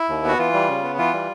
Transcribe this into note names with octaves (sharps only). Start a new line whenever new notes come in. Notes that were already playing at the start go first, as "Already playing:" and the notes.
Already playing: E4
D#2
B3 F#4
E3 F4
G3
C#3
B3
E3 F4
G3